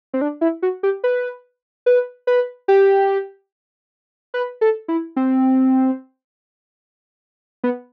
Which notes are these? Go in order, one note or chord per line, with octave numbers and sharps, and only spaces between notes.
C4
D4
E4
F#4
G4
B4
B4
B4
G4
B4
A4
E4
C4
B3